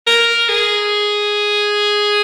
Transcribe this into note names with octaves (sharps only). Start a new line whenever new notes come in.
A#4
G#4